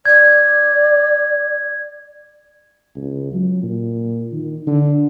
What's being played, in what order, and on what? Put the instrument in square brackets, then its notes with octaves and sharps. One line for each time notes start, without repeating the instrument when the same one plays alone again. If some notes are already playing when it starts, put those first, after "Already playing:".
[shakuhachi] D5 [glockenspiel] G#6
[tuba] C#2
F#3
A#2
D#3
D3